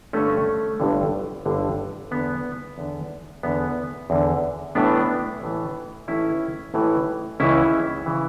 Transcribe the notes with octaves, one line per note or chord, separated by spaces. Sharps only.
G1 G2 D3 A3 C#4
G1 G2 D3
G1 G2 D3
E2 D3 B3
E2 D3
E2 D3 B3
E2 D3
A1 A2 E3 B3 D4
A1 A2 E3
A1 A2 E3 C#4 E4
A1 A2 E3
C#2 C#3 E3 C#4 E4
C#3 E3